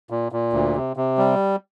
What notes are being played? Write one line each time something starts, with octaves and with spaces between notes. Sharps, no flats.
A#2
A#2
D2
C3
C3
G3